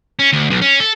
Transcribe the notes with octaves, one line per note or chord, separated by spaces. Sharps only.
C#4
D2
B1
C#4
A4